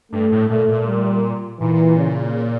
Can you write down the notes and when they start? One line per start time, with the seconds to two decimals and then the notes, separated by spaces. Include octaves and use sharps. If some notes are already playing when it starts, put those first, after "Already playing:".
0.12 G2 A3
0.32 A2
0.50 A#2 A3
0.68 A#2
0.87 G3
1.60 A#2 E3
1.97 C#3